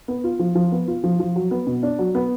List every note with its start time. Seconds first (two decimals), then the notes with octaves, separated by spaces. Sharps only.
0.08 B3
0.24 F4
0.39 F3
0.55 F3
0.72 B3
0.88 F4
1.04 F3
1.20 F3
1.36 F#3
1.51 B3
1.67 B2
1.83 D4
1.99 F#3
2.15 B3